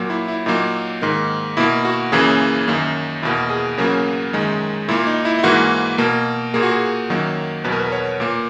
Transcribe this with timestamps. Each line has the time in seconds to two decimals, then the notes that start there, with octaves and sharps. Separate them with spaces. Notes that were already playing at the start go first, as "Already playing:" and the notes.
Already playing: A#2 F#3 A#3
0.10 E4
0.28 E4
0.46 A#2 F#3 A#3 D#4
1.02 G#2 D#3 A#3
1.57 B2 A#3 E4
1.85 F#4
2.12 F#2 C#3 E3 A#3 G#4
2.68 F#2 D#3 A#3
3.22 E2 B2 A#3 E4
3.50 G#4
3.77 E2 C#3 F#3 A#3 A#4
4.33 F#2 D#3 G#3
4.88 A#2 A#3 E4
5.07 D#4
5.25 E4
5.39 E4
5.43 G#2 E3 A#3 F#4
5.98 B2 A#3
6.54 A#2 A#3 G#4
6.63 F#4
6.71 G#4
7.10 F#2 D#3 F#3 A#3
7.64 E2 B2 F#3 B4
7.72 A#4
7.79 B4
7.92 C#5
8.20 A#2 A#3